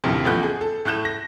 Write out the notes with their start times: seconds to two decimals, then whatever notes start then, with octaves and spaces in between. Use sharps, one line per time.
0.04 A#1 D#2 A2 C3
0.25 A1 F3 A3 B3 F#6 G6
0.43 G#4
0.61 A4
0.85 A2 A3 F#6 G6 E7
1.05 A#6